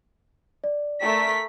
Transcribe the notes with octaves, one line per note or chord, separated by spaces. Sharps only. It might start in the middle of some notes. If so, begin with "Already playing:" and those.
D5
A3 A#4 B6